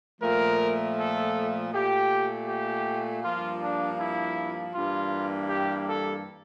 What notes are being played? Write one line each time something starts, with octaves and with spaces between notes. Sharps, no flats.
A#2 F3 A3 A#4
A4
A#2 A3 G4
G4
G2 F3 A#3 F4
D4
E4
G2 E3 G3 A#3 F4
G4
A4